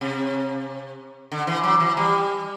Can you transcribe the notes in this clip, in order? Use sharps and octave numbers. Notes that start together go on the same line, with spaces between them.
C3
D3
E3
F#3
E3
G3